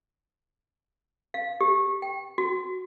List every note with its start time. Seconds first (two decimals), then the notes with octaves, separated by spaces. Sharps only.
1.34 F5
1.61 G4
2.02 G5
2.38 F#4